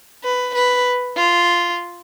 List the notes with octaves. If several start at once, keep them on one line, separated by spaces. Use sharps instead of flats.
B4
B4
F4